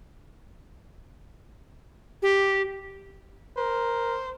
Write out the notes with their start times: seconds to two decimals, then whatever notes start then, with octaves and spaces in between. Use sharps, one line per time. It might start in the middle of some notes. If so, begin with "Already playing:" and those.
2.22 G4
3.57 A#4 C5